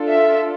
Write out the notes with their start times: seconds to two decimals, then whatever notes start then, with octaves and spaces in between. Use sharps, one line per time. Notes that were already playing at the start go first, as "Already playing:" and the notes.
Already playing: D4 F4 A4
0.08 E5